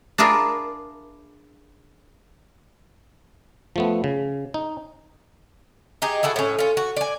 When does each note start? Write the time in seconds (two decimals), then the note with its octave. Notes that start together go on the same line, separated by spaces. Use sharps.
0.18 D4 E4 F4 G#4 A#4
3.76 F3 A3 B3
4.04 C#3
4.54 D#4
6.02 D#4 G4 G#4 D#5
6.23 E4 F#4 G#4 A4
6.36 A2 C#4
6.59 C#4 F4
6.77 F#4
6.96 D5 G#5